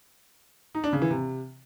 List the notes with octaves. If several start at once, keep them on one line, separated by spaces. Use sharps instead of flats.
D#4
D4
C#3
E3
C3